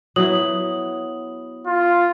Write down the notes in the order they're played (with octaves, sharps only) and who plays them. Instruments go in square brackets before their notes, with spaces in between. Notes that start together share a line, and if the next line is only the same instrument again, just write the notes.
[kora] F#3 B3 E4 [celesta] C#5 D#6 F#7
[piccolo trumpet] F4